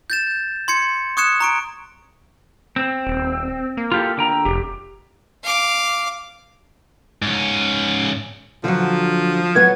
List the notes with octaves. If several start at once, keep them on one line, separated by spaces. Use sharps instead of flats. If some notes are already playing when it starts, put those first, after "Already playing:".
G6 A6 E7
C6 G#6 C#7
C#6 D#6 F#6 G#6 C#7 E7
A#5 C#6 D7
C4
D#1
A#3
F4 G4 A4
D3 G5 A#5
F1 G4
F5 D6
G#2 C#4
D3 F3 F#3
F#3 B3 C#5 G#6